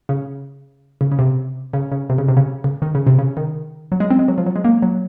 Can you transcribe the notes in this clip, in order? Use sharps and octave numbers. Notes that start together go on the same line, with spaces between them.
C#3
C#3
C#3
C3
C#3
C#3
C3
C#3
C3
C#3
C#3
D#3
C#3
C3
C#3
D#3
F#3
G#3
C4
G#3
F#3
F3
F#3
G#3
A#3
F#3